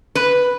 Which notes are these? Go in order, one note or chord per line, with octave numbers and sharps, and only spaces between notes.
B4